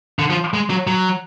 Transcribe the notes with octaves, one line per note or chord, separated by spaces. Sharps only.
D3
F3
G#3
F#3
F#3